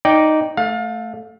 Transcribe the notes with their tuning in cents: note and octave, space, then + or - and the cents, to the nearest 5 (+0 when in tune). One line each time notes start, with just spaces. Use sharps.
D#4 +0 D5 -10 G5 +0
A3 +0 F5 +30